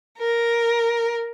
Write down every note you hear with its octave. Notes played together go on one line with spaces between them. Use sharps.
A#4